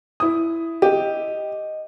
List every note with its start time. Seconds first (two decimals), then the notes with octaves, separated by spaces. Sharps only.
0.20 E4 D#6
0.82 G4 D#5